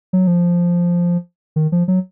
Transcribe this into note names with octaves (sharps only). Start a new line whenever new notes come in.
F#3
F3
D#3
F3
F#3